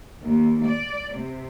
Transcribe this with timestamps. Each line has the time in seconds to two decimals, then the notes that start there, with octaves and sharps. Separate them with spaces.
0.22 D#2
0.64 D5
1.13 C3